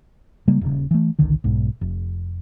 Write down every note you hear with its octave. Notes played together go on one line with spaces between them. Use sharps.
C#3 G3 G#3 A#3
D#1 D#2 C#3
E3 A3
G#1 C#2 D3 D#3
B1 G#2
F1